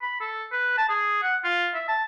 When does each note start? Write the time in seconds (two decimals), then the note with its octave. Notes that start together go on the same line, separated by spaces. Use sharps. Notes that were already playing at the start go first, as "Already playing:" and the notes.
0.02 B5
0.21 A4
0.52 B4
0.78 A5
0.89 G#4
1.23 F#5
1.44 F4
1.75 E5
1.89 A5